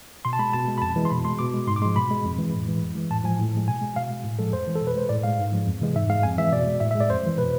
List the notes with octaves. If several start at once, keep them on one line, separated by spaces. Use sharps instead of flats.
B2 C6
A5
G#3 B5
B2 A5
G#3
B5
F2 A5
E3 G#3
C6
B2 B5
G#3 C6
B2 D6
G#3
G#2 C6
D6
F3 G#3 C6
B2 B5
G#3
F2
E3 G#3
A2
E3 G#3
F2
E3 G#3
A2 A5
F3 G#3 G#5
A2
F3 G#3
B2 G#5
G#3
B2 F5
G#3
A2
F3 G#3 A4
F2 C5
E3 G#3
A4
B2
B4
G#3 C5
A2 D5
G#3 F5
G#2
F3 G#3
F2
C3 E3 G#3
G#2 E5
G#3 F5
F2 G#5
E3 G#3 E5
B2 D5
G#3
A2 E5
E5
G#3
D5
F2 C5
E3 G#3
B2 B4